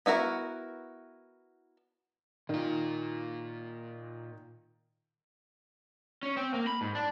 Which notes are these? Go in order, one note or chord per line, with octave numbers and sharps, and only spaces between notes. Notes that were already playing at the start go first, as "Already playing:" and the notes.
B3 E4 F#4 A#4
A#2 D#3 F4
C#4
C4
A#3
B5
G#2
D4